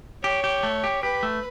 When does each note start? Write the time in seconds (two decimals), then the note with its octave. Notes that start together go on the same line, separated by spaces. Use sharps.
0.23 G4 C#5
0.44 G4
0.63 A3
0.84 G4
1.03 G4 B4
1.23 A3